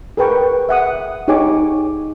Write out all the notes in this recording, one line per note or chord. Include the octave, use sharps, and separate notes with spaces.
G#4 A#4 B4 G5 C#6
E5 F#5 D#6
D#4 G4 G#4 C#5 G#5 D6